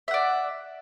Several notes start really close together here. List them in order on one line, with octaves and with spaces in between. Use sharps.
E5 F#5 D5